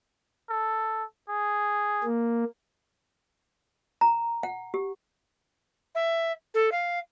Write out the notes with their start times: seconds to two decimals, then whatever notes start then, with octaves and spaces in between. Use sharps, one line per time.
0.50 A4
1.29 G#4
2.04 A#3
4.01 A#5
4.43 F#5
4.74 G4
5.95 E5
6.54 A4
6.72 F5